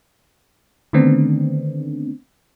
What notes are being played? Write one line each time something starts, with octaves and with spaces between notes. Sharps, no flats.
D3 D#3 A3 B3 C4 D4